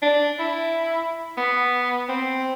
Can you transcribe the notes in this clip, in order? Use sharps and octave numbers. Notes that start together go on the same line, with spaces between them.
D4
E4
B3
C4